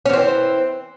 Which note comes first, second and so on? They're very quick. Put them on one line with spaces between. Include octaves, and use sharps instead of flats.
C#4 E3 C4